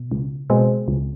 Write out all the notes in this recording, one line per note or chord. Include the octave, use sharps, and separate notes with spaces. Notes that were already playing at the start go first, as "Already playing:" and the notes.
Already playing: B2
C#2
B2 G#3 C4
C#2